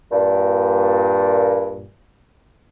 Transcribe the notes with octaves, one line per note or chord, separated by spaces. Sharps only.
G2 A#2